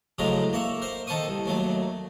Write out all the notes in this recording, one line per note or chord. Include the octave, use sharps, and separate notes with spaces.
F2 A2 C#3 F#3 G#3 A#5
A#3 C#5 E5
A#4 C5
D#3 A4 C5 C#6 D#6
C2
D#2 F#3 A3